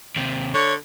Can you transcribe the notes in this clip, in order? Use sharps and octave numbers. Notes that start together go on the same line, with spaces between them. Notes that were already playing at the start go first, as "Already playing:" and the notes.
D#2 C3
D3 C#5 C#6